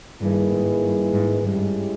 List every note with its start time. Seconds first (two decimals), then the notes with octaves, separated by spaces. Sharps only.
0.21 G2 D#3 A#3 E4 G#4 B4
0.52 G#2
0.82 G2
1.13 G#2
1.43 G2 G#3 C#4 E4 G4